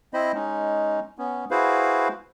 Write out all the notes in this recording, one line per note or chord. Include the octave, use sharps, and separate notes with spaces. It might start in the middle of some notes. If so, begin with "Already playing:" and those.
C4 E4 C5 D#5 B5
G#3 C#4 D#4
B3 C#4
E4 F#4 G#4 B4 C5 F5